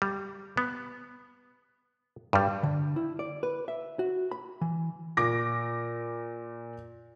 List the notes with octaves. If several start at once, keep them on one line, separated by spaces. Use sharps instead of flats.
G3
B3
G2 G3
D3
E4
D5
B4
E5
F#4
B5
E3
A#2 D6 A#6